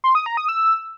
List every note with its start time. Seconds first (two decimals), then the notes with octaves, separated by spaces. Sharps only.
0.04 C6
0.15 D#6
0.26 A#5
0.37 D#6
0.48 E6